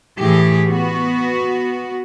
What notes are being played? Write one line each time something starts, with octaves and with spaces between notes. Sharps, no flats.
A2 E3 G4 G#4
B3 F#4